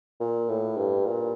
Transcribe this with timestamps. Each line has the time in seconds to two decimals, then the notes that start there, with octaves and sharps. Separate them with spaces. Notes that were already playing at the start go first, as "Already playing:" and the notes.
0.20 A#2
0.49 A2
0.77 G2
1.06 A#2